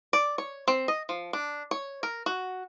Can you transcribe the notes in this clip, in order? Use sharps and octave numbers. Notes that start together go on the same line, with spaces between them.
D5
C#5
C4
D#5
F3
D4
C#5
A#4
F#4